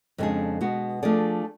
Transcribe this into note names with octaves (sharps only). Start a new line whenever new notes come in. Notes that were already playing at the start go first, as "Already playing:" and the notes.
F2 C#3 G#3 D4 G#4
B2 G#3 B3 F#4
F3 A3 D4 G#4 D5